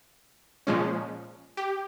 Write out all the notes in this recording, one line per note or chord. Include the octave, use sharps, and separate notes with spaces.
A#2 F3 G#3 C#4
G4